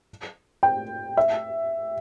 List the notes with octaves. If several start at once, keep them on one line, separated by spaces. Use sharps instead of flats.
G5
E5